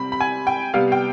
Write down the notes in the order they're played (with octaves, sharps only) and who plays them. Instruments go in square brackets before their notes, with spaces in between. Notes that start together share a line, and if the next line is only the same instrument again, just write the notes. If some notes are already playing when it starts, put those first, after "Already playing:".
Already playing: [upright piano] C3 G3 C4 B5
B5
G#5
G5
C3 G3 B3 F5
G5